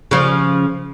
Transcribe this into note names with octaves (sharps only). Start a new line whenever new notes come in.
C#3 F3